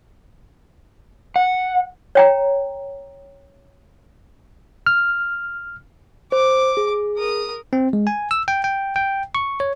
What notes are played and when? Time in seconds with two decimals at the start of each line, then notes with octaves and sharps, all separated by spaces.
1.36 F#5
2.15 C#5 G5 A#5
4.86 F6
6.32 C5 D6
6.77 G#4
7.17 A#4 D#6
7.73 C4
7.93 G#3
8.07 G#5
8.31 E6
8.48 G5
8.64 G5
8.96 G5
9.35 C#6
9.60 C#5